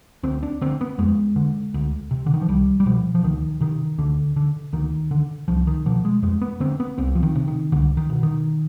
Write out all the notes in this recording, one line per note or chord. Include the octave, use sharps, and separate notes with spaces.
D2 C4
D4
D3 C4
B3
F2 G#3
D3
D2
C3
D3
D#3
F3
C2 G3
G3
B2 F3
F3
D2 D#3
C3 D#3
D2 D3
D3
D2 D#3
D3
C2 F3
D#3
B2 F3
G#3
F2 G#3
B3
D3 C4
B3
C2 C4
F3
D#3
C3
D#3
C2 D3
D#3
B2
D#3